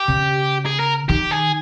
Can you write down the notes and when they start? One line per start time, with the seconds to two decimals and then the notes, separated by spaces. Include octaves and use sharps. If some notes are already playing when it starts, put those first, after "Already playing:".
Already playing: G4
0.08 C#3
0.66 G#4
0.80 A#4
1.09 D#3 G4
1.31 G#4